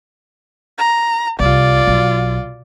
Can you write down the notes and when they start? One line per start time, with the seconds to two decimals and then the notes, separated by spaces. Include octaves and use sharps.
0.78 A#5
1.40 C2 F4 D5
1.87 B1